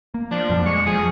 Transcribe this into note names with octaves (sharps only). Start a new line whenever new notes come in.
A#3
F3 D4
F2 B2 F#3
G#3 C#6
F3 G#4